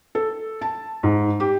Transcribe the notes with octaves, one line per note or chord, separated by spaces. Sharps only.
A4
A5
G#2
G4